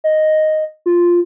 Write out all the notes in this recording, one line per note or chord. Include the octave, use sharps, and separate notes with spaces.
D#5
F4